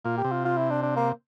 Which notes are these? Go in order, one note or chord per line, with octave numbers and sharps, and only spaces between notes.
A#2 F4
G4
C3
F4
F4
E4
D4
D4
A#3